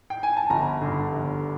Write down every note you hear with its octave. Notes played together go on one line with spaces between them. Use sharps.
G5
G#5
A5
G1 A#5
G2 D3
G1